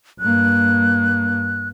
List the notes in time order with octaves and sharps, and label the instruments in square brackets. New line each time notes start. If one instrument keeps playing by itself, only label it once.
[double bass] G2 A#3 [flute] F#6